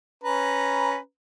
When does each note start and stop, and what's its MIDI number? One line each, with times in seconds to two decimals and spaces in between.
0.24 0.97 61
0.24 0.97 71
0.24 0.97 82